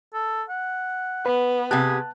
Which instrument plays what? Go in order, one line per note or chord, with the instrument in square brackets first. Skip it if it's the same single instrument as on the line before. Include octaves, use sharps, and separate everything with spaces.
[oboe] A4
F#5
[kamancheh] B3 [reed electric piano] B4
[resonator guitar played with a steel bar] C3 G4 [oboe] G#4 [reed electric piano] A5 F#6